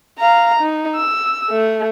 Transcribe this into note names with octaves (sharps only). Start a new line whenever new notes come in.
F5 A#5
D#4
E6
A3